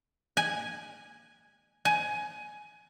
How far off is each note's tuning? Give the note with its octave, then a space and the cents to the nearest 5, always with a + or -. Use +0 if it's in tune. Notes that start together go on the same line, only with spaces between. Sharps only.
G#5 -5
G#5 +15